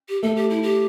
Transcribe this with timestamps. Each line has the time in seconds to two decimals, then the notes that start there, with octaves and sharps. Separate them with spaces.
0.09 G4
0.23 A3 A4
0.36 G4
0.50 E4
0.63 G4